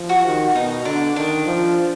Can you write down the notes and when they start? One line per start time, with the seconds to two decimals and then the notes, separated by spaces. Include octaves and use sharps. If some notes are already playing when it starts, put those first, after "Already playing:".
Already playing: F3
0.09 F#4
0.25 D#3
0.55 B2 D#4
0.85 D3 D4
1.16 D#3 D4
1.46 F3